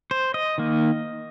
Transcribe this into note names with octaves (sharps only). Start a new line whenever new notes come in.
C5
D#5
D#3 A#3